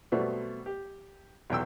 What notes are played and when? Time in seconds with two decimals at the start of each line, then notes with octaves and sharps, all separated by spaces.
0.12 B2 F#3 G3 A3 B3 C4
0.66 G4
1.50 B1 E2 G5 E6